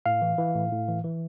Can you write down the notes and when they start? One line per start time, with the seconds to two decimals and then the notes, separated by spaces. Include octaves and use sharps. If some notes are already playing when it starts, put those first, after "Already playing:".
0.06 A2 F5
0.22 E3
0.38 E3
0.55 A2
0.72 A2
0.88 E3
1.04 E3